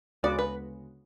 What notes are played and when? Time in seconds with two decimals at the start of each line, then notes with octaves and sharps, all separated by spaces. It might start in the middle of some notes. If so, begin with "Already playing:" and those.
0.23 D2 C#3 G#3 B3 F#4 D5
0.39 B4